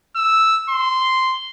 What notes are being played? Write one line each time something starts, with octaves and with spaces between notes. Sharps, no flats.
E6
C6